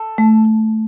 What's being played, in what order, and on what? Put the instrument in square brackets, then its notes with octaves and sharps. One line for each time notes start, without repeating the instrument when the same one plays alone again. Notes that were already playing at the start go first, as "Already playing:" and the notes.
Already playing: [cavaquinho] A4
[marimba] A3